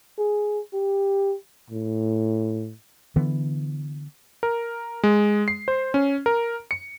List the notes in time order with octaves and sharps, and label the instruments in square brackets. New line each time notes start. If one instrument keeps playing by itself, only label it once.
[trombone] G#4
G4
A2
[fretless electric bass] D3 E3 B3
[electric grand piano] A#4
G#3
C7
C5
C#4
A#4
C#7